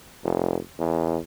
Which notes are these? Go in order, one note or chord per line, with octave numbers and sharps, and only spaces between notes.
F1
E2